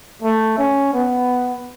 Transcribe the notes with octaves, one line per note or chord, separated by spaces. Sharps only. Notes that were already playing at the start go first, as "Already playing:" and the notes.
A3
C#4
B3